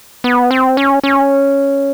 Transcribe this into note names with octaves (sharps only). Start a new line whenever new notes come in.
B3
C4
C#4
C#4